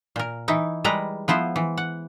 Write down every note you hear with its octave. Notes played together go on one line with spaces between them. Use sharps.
A#2 A#4
E3 D#4 E4
G3 G#3 A#4 B4 A#5
F3 B3 E4 C5
E3
F#5